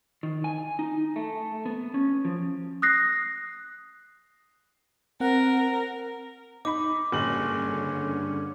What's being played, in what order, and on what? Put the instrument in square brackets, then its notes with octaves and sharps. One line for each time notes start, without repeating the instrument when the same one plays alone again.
[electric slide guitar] D#3
G#5
D#4
A3
B3
C#4
F3
[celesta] D#6 F#6 A#6 C7
[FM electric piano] C4 F#5 [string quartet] A#4
[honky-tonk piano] D#4 B5 [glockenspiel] D6
[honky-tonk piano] F#1 F#7 [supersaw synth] G2 D3 C#4